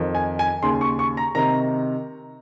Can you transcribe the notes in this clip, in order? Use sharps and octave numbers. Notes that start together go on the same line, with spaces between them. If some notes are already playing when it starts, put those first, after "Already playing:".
Already playing: F2 D#3
G#5
G#5
D#2 C#3 C6
C#6
C#6
A#5
C3 D#3 A#5